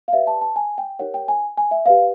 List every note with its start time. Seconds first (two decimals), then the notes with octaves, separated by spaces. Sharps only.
0.08 F5
0.13 G4 B4 D5 E5
0.27 A5
0.41 A5
0.56 G#5
0.78 G5
0.99 D#4 G4 A#4 C#5 F#5
1.14 G5
1.28 G#5
1.58 G#5
1.71 E5
1.86 G4 B4 D5 F5